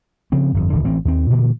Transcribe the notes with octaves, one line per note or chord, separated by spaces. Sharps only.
C#3 F3 C4
G1 F2
D1 D3 E3
A1 E3 C4
D#2 C4
A#2 D3 E3 A#3